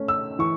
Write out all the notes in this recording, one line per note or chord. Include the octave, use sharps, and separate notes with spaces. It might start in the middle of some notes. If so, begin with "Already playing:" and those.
Already playing: A3 C#4
E6
E3 C#6